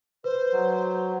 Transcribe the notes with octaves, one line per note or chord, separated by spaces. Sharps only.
B4 C5
F#3